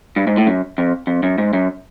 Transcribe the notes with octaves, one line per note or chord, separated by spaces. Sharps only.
G2
G#2
A2
F#2
F2
F2
F#2
G#2
F#2